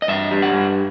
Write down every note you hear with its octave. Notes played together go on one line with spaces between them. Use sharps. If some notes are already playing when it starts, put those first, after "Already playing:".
D#5
G2 E5
G3
F#5
G2